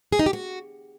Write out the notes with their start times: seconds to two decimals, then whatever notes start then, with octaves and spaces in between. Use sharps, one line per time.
0.12 G#4
0.19 D#4
0.26 G4
0.33 F#4